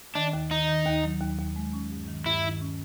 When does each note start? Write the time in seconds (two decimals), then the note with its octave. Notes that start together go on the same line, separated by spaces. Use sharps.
0.15 D#3 D4
0.33 D#2
0.51 D#3 D#4
0.69 D#3
0.86 D#2
1.04 F#3
1.21 D#2
1.38 D#2
1.56 G#3
1.73 C#4
1.91 G2
2.08 D#3
2.26 G2 E4
2.44 D#3
2.61 C#4